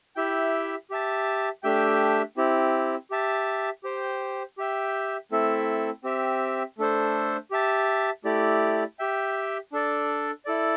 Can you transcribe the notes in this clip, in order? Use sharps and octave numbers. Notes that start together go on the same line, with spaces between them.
E4 G4 E5 G5
G4 E5 A5
A3 D4 G4 E5 G5
C4 E4 G4
G4 E5 A5
G4 C5 G5
G4 E5 G5
A3 C4 E4 A4 E5
C4 G4 E5
A3 D4 A4 C5
G4 E5 A5
A3 E4 G4 D5
G4 E5 G5
D4 A4 D5
E4 A4 D5